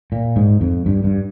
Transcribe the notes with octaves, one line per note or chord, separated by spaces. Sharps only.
A#2
G#2
F2
G2
G2